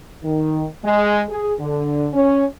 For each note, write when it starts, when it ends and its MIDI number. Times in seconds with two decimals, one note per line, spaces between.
0.23 0.65 51
0.84 1.23 56
1.29 1.53 68
1.59 2.08 50
2.14 2.44 61